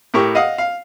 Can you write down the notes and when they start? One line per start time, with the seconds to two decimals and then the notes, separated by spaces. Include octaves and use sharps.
0.14 A2 G4 A#4 C#6
0.35 D#5 F5 F#5 D#6
0.58 F5